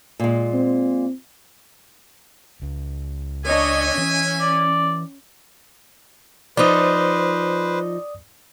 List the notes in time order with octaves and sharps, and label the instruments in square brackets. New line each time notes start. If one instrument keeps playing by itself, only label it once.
[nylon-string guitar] A#2 G#3
[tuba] C4
[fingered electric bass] C#2
[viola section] D4 C#5 D#5 [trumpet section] E5 G#5
[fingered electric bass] E3 [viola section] C#4
[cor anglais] D5
[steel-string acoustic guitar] F3 D#4 [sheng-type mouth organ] B4 C5 [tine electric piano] D5 D#6